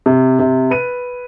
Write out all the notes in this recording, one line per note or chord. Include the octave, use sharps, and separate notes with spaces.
C3
C3
B4 D#7